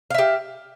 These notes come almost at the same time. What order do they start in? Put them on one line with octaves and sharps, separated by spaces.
F5 E5 G4